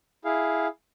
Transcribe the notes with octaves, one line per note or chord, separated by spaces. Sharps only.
E4 G#4 F5